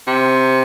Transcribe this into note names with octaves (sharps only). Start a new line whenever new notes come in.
C3